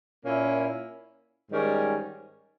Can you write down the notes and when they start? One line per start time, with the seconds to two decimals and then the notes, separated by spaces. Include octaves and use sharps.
0.24 A#2 A#3 C#4 E4
1.50 G#2 D#3 G3 C#4